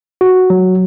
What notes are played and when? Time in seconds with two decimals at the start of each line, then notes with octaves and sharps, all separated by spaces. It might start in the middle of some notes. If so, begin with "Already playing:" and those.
0.21 F#4
0.50 F#3